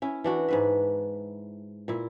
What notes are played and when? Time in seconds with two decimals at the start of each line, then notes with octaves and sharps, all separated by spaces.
0.02 C#4 E4
0.24 E3 D4 F#4
0.48 G#2 B4 E5
1.88 A#2 E4